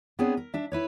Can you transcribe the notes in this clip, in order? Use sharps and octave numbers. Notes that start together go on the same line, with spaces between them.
B3 C4 D4 G#4 C#5
A#4
D4 E5
E4 B4 C#5